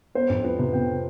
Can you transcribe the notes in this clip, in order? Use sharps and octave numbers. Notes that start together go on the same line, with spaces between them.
B3 C5
F2
F3 B4
C3
C3 G5